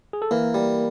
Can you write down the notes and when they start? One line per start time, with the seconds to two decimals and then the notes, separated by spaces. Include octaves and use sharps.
0.13 G#4
0.22 A4
0.31 E3 A#3 A#4
0.54 G3